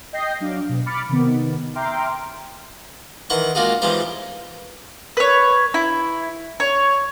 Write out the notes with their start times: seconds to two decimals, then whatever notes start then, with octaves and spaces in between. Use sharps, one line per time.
0.13 D#5 G5 G6 A#6 C7
0.40 F#3 D4 F5 D6
0.69 B2
0.86 B5 D6 F6 A6 C#7
1.09 C3 D#3 B3
1.75 E5 G5 A#5 C6 D6 F6
3.30 D#3 E3 F#5 C6 C#6
3.55 G#3 A#3 D4 F4 F#4 G#4
3.82 E3 F3 G3 G#3 D#4 C5
5.17 B4 C#5
5.74 E4
6.60 C#5